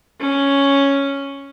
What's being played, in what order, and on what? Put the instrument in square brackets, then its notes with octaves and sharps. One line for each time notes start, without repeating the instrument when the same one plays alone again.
[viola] C#4